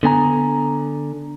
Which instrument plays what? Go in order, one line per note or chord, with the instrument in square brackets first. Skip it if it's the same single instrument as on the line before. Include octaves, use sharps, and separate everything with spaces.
[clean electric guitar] D3 B3 G#5 A#5